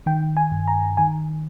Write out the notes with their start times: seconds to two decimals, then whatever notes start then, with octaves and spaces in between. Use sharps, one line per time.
0.06 D#3 G5
0.37 G#5
0.52 G2
0.68 A#5
0.97 D#3 G#5